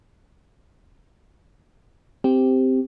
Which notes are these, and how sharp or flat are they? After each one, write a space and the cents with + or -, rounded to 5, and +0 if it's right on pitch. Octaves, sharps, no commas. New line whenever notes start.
C4 -10 G4 +0